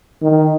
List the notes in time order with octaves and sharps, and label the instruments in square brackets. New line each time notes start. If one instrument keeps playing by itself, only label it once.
[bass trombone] D#3